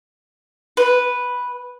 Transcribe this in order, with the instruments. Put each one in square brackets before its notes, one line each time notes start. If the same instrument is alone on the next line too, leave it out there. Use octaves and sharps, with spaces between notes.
[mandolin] B4